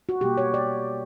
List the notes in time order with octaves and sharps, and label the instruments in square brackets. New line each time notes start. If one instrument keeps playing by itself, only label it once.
[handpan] F#4
B2 G3 A#3 G4
C#5
D5